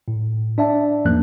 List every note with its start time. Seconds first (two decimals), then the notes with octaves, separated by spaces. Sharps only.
0.08 A2
0.58 D4 D5 E5 A5
1.05 E2 G#2 F3 A#3 C#4 F#6